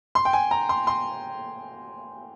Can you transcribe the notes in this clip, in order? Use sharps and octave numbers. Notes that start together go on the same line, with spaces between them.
C6
G5
G#5
A#5
C6
C6